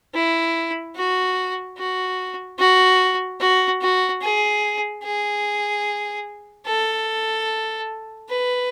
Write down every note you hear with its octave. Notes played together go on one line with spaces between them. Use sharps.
E4
F#4
F#4
F#4
F#4
F#4
G#4
G#4
A4
B4